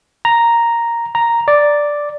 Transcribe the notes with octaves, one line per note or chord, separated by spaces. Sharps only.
A#5
A#5
D5